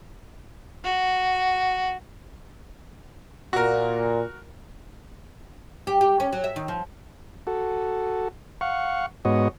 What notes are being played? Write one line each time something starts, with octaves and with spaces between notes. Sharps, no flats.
F#4
A#2 F#4 A#4
G4
G4
C#4
F#3
E5
D#3
F3
F#4 A4
F5 F#5 C#6
G#2 B3 F#4 C#5 D#5